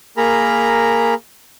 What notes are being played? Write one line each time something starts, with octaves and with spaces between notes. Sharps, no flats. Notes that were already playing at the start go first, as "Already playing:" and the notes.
A#3 G#4 A#4 A#5 B5